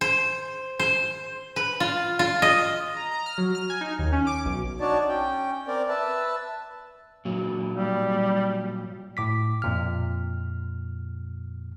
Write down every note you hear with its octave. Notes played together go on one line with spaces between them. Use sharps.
C5
C5
B4
F4
F4
D#5
A#5
A#5
F6
F#3
F6
G#5
D#4
D#2
C#4
D6
B1
D4 D#4 F#4 C#5 D5 A5
C#4 G5
C4 A#4 D5
B4 E5 A5
A#2 F#3
G3
A2 D6 B6
F2 A#2 F6